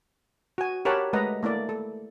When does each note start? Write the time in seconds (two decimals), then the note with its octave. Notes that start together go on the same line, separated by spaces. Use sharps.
0.58 F#4 G#5
0.85 G4 A#4 C#5 F#5 A5 B5
1.13 G#3 A3 B4 D#5 F#5 A#5
1.43 A3 A#3 E4 D5
1.69 A4